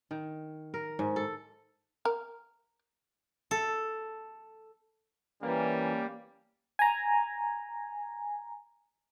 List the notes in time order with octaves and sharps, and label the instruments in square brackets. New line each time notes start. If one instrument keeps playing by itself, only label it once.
[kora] D#3
A#4
G#2
A4
[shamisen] A#4
[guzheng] A4
[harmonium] E3 [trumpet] G3 [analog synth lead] A#3 [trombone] C#4
[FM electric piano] G#5 A#5